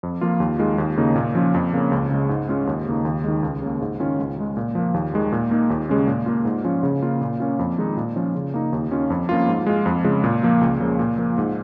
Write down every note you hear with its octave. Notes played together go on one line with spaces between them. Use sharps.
F2
F3 A#3 F4
D#2
D#3 G#3 F4
D#2
C#3 A#3 D#4
A#2
F3 C#4 F4
F2
C#3 A#3 C#4
C#2
C#3 G#3
G#2
G#3 C#4 F4
D#2
C#3 A#3 D#4
D#2
D#3 G#3
C#2
C#3 A#3
G#2
D#3 C#4 F4
C#2
C#3 G#3
A#2
F3 A#3
D#2
D#3 G#3
A#2
A#3 D#4
D#2
C#3 G#3 C#4
A#2
A#3 F4
G#2
F3 C#4 F4
C#3
A#3 F4
A#2
A#3 C#4 F4
F2
D#3 G#3 D#4
A#2
F3 C#4 F4
C#3
A#3 D#4
D#2
D#3 C#4 F4
F2
F3 A#3 C#4 F4
G#2
G#3 F4
F2
C#3 G#3 F4
A#2
F3 A#3
C#2
C#3 F3 A#3
A#2
F3 A#3
G#2